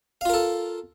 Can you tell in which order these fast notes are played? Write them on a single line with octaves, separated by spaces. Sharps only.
F5 F4 A#4 A4